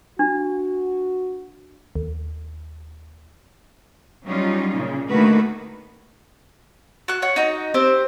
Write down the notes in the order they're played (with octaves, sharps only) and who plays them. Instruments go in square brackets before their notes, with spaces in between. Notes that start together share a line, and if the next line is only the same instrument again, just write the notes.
[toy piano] D4 [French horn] F#4
[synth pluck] D#2
[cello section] F#3 G3 C#4 D#4 F4
A#2 C#3
D3 D#3 A3 A#3 F#4 B4
[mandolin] F#4 F#6
C#5 F#5
D#4 F#4
C4 G4 C5